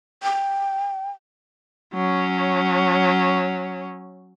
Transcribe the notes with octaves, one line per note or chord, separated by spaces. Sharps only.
G5
F#3 C#4